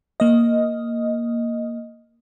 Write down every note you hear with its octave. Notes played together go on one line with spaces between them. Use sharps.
A#3 D#5